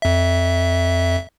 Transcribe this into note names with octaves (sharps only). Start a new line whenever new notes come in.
F2 E5